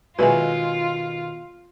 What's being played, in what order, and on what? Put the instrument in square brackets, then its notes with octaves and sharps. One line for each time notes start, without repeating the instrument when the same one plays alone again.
[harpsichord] B2 D#3 [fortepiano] F#3 G#3 E4 [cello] F4 [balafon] B4 G#5